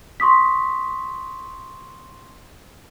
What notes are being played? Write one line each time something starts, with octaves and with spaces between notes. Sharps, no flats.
C6 C#6 D#6 B6